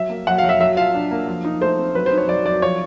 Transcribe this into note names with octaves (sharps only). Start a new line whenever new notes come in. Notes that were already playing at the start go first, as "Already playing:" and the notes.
Already playing: F#3 E5
A#3
F#3 F#5
F5
F#3 E5
F#3 E5
F4 F5
D4
A#3
F3
D#4
A3 C5
C4
F#3 B4
C5
D#4
C#5
F#3 D5
F#3 D5
F3 C#5